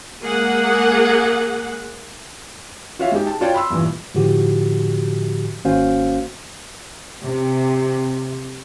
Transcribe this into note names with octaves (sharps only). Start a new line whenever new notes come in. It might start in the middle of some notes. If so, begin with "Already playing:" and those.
G#3 A#3 G#4 F#5
F4 F#4 C#5 E5 F5
G#3 D#4 G4
A5
F4 C#5 D5 G5
B5 C6 E6
G2 A#2 E3
A2 D3 F3 F#4 G4
G#1 A#3 C#4 F#4 C5 F5
C3